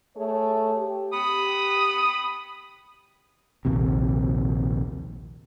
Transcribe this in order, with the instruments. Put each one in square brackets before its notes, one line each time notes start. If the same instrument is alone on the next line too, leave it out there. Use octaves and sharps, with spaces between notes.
[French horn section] A3 G#4 C#5
G4
[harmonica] B5 D#6
[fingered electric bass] A#1 D#2 C3